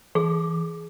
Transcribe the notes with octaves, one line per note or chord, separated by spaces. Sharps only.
E3 G#4